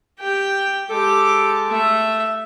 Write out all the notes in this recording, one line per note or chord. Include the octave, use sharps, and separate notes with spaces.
G4 G5
G#3 G4 A4 D6
A3 E5